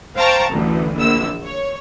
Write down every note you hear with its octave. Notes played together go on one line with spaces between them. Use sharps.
C5 F5 G5 A5 A#5 C#6
A1 D2 E3
A#1 E6
C#5